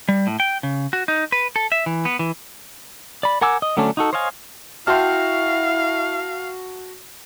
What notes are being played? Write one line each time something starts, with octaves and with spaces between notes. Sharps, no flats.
G3
A2
G5
C#3
F#4
D#4
B4
A4
E5
E3
B3
E3
D5 B5
A#4 F#5 G#5 D6 E6
D#5
D3 F#3 A3 C#4 D4
D#4 F#4 A4
C5 C#5 D#5 F5 G#5
E4 F#4 E5 F5 G5 A5 C6 F6